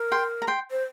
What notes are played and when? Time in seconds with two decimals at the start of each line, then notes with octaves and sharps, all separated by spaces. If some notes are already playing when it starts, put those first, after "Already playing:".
Already playing: A#4
0.12 G5 C6
0.42 A#5
0.47 G5 C6
0.71 C5